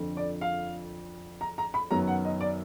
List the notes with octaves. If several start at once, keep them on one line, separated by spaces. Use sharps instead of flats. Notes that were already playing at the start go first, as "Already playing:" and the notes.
Already playing: F2 D3 F3
D5
F5
A#5
A#5
B5
F#2 D#3 F#3 B3 A#5
F#5
D#5
D5